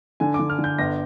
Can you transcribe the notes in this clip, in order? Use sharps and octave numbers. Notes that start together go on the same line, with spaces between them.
D3 G#5
D6
D3
F6
D3
G6
G1 A#6